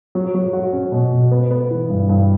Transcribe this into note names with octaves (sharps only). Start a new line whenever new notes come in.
F#3
F#3
F#4
C#4
B2
B2
B3
B3
E3
G2
G2